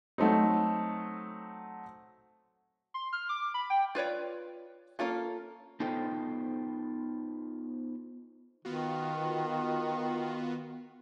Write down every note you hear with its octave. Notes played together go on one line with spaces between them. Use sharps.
F#3 A3 C4 D#4
C6
F6
D6
B5
G5
F4 B4 C#5 D5
A#3 C#4 F4 A4
B3 D#4 F4 A4 C5 G5
D#3 B3 F4 F#4